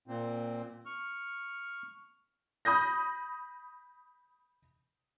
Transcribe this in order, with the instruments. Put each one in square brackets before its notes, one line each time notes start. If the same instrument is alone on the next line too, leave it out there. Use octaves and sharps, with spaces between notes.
[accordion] A#2 C4
C#6 F6
[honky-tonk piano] B5 D#6 G6 A#6